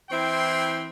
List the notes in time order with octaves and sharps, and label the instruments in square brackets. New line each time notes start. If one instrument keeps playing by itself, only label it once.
[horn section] E3 C4 E4 G5 C6